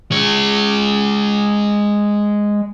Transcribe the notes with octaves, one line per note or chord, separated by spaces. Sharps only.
G#3 C#5